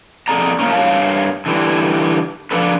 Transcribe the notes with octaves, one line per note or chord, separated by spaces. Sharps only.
F2 G#4 A4 D5 A#5
A#3 C#4
G2 C#5 F5 A5
D3 E3 G3
F3 D4 A4 B4